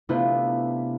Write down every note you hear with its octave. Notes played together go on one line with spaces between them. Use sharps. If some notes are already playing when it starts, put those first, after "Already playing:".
C3 A3 B3 D4 E4 F4